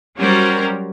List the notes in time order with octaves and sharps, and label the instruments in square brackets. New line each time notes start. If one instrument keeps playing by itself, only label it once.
[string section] F#3 G3 C#4 F#4 A#4 C5